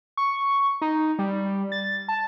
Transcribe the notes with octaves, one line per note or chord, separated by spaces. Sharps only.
C#6
D#4
G3
A6
A5